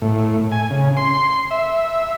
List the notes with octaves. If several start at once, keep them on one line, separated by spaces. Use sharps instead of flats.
A2
G#5
C#3
C6
E5